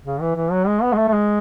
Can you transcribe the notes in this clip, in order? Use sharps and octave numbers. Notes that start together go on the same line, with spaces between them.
C#3
E3
E3
F#3
G#3
B3
G#3
A3
A3
G#3